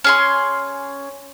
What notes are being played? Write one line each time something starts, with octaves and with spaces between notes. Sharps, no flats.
C#4 G#4 C6